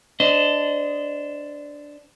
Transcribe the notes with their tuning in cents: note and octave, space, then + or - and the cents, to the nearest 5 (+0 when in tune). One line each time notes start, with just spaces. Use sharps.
D4 -5 C5 -25 D#5 +0